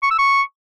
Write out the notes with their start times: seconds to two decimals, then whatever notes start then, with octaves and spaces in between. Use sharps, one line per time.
0.03 C#6
0.11 E6
0.19 C#6